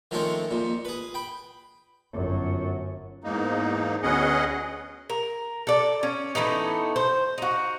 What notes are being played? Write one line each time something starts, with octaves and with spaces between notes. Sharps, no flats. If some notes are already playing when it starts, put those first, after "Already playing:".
D#3 F3 G#3 A3 C4 C#4
F2 A#2
G#4 B4
G5 B5
G1 F#2
E2 G#2 A#3 D#4
D2 B3 C#4 G#4 D#5 F#5
A#4
A4 D5
C#4
E3 A3 B3 D#4
C5
D#4 F#4